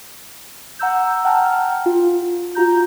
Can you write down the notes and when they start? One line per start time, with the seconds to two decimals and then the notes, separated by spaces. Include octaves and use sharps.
0.79 F#5 A#5 E6 G6
1.25 F#5 G5 A5 A#5 F6
1.86 F4
2.55 F4 F#4 A#5 G6